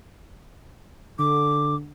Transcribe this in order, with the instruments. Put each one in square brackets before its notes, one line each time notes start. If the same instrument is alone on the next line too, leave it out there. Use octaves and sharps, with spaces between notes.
[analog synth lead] D3 [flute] D6